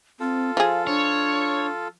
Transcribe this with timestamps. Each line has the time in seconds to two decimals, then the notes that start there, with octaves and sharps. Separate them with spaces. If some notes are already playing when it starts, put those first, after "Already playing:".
0.20 C4 F4 A4
0.57 F3 G#4 F5
0.87 D4 C#5